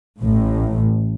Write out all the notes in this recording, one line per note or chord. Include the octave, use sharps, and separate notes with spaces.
A1 A2